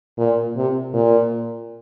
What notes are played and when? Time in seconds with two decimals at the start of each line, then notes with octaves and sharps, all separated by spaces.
0.18 A#2
0.56 C3
0.94 A#2